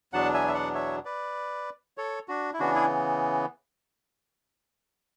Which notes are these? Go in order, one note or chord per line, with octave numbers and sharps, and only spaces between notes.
E2 B2 F#3 B3 D4 F#5 A5
E5 G#5
E5
D5 F#5
C#5 E5
B4 D5
A4 C#5
D4 F#4
E4
C#3 E3 B3 D4 F#4
E4 G#4